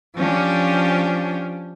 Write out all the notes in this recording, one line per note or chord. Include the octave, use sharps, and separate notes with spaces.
F3 C#4 D4 G4